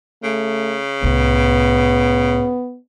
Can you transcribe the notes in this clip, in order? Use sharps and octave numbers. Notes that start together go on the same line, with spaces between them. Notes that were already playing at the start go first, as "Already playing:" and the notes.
C#3 A3
C2 A2 B3